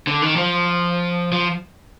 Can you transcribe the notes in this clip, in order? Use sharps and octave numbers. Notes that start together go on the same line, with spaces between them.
D3
D#3
F3
F3